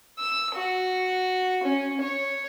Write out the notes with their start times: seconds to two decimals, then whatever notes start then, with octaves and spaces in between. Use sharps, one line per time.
0.19 E6
0.55 F#4
1.64 C#4
2.01 C#5